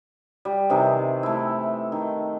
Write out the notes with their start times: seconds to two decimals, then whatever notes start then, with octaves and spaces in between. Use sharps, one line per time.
0.45 G3
0.70 C3 D#3 E3 G#4
1.23 A3 E4
1.92 D#3